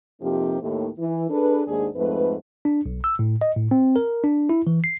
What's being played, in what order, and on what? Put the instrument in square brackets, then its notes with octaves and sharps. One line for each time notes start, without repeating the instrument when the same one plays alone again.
[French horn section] F2 C3 F3 A#3 D#4 G4
D#2 A2
E3
D4 G#4 A4 B4
D#2 G#2 D4 G#4
F2 G#2 A3 B4
[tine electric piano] D4
B1
E6
A2
D#5
A2
C4
A#4
D4
E4
E3
C7